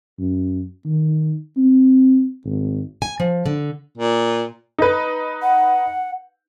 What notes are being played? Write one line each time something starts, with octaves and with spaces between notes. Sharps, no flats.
F#2
D#3
C4
G#1
G#5
F3
D3
A#2
D#4 B4
F#5